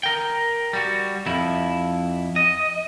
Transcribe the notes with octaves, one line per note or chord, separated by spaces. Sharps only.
A#4 G5
G3 F#4
F2 E4
D#5